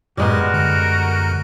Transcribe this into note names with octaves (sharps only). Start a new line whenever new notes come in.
F#2 A2 G3 G#3 B3 F#4 A#4
F#2 D3